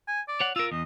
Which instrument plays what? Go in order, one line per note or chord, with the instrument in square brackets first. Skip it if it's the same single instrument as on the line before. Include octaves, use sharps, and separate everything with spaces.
[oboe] G#5
D5
[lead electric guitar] C#5 F#5
[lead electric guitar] F4 A#4 [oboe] E6
[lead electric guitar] E2 [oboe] D#5